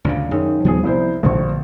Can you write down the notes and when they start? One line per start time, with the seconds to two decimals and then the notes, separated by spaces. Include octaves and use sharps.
0.05 D2 A#2 C#3 D4 F5
0.31 F#2 D#3 G#4 C#5
0.65 D#1 F3 G3 B3 G#4
0.84 C2 E4 C5
1.23 A#1 B2 D3 A3 C#6